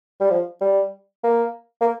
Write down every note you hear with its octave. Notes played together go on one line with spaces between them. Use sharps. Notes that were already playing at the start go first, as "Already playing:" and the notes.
G3
F3
G3
A#3
A#3